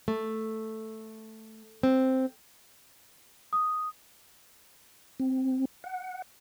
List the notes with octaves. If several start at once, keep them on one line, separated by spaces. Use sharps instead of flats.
A3
C4
D#6
C4
F#5